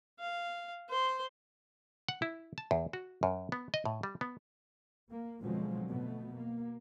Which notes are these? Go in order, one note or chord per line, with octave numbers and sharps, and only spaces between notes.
F5
C5 C6
F#5
E4
A5
E2
F#4
F#2
B3
D#5
A2
G3
B3
A#3
B2 D3 F3 F#3 G#3 C4
B2 A3 B3
A#3